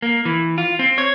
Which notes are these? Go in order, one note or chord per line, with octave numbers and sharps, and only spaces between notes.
A#3
E3
F4
C4
C#5